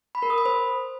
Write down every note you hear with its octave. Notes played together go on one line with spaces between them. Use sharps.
B5
A#4
D#6
B5
C5